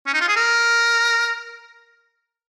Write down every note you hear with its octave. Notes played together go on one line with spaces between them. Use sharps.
C#4
D#4
F4
G#4
A#4